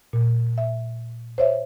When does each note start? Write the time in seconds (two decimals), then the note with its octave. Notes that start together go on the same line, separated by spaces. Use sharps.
0.13 A#2
0.58 E5
1.38 C5 C#5 E5